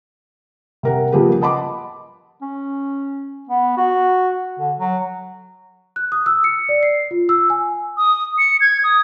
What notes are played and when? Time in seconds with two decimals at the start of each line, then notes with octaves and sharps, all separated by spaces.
0.83 C3 A#4 F#5
1.12 C#3 F3 A#3 G4 G#4 B4
1.41 D#5 F#5 A5 B5 C6 D6
2.41 C#4
3.49 B3
3.77 F#4
4.60 D3
4.79 F#3
5.96 F#6
6.12 D#6
6.26 E6
6.44 C#7
6.69 D5
6.83 C7
7.11 F4
7.29 E6
7.50 G#5
7.97 D#6
8.38 C#7
8.61 G#6
8.84 D#6